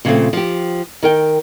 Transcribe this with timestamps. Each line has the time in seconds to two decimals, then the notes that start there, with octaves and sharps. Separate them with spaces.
0.05 A#2 C#3 F3 G3 A3 C4
0.33 F3 G4
1.03 D#3 A#4 G5